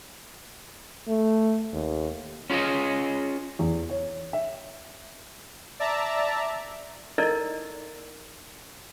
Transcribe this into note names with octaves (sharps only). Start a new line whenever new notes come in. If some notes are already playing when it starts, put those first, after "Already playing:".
A3
D#2
C#4 F4 G#4 C#5 D#5
E2
C#5
E5
D5 E5 A5 A#5
D#4 E4 A4 A#4 D5 D#5